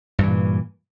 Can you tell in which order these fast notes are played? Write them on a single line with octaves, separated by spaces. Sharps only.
G2 E3 A#2